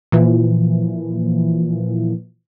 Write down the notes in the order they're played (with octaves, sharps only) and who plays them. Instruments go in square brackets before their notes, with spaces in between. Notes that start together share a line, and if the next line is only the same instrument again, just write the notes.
[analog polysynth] A#2 E3 F3